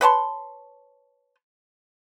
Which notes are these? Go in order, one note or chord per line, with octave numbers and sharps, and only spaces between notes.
B4 C#5 A5 C6